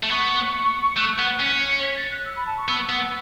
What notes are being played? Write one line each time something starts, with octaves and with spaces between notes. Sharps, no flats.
A3
B3 C#6
A3 F#6
B3
C#4 B6
C#7
C#7
B6
A6
F#6
E6
B5
A5
C#6
B3 E6
B3